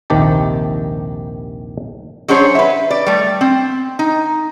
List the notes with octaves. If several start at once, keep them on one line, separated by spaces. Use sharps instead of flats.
A#1 D#2 C3 D#3 G4 A5
F#3 C#4 D4 G#4 C5 C#5
B4 E5
D5
G3 A3
C4
D#4